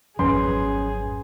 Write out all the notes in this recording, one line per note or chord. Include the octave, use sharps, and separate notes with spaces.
G#1 F2 F#3 C#4 G#4 B4 G#5 C6